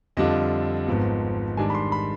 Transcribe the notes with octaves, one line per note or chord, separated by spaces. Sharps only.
F2 D3 G3 D4 F4 D#5
G#1 G#2 F3 B3
G#2 D#3 G3 D4 G#5
B5
C6
B5